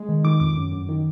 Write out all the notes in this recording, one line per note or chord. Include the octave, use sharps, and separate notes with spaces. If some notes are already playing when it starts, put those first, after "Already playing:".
Already playing: G#3
D#3
D#3 D6
F2 D6
F#2
F#2
D#3